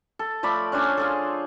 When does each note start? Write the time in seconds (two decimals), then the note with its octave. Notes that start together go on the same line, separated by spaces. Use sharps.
0.19 A4
0.43 F3 A3 D5 B5
0.72 C#4 D4 C5 G#5
0.97 F4 G#4 A4